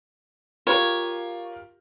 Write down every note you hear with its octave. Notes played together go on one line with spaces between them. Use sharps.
F4 G4 A#4 C#5